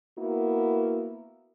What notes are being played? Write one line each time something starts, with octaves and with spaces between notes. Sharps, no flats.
A#3 B3 E4 F#4 A#4